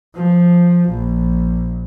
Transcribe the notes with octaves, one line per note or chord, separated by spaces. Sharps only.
F3
A#1